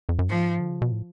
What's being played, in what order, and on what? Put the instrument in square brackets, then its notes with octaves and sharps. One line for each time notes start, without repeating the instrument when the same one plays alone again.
[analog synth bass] F2
F#2
[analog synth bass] G#2 [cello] F3
[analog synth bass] D3
C#3
B2
A2